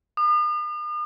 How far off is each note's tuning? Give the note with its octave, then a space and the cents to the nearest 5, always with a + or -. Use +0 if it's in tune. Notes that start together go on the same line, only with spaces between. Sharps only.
D#6 -45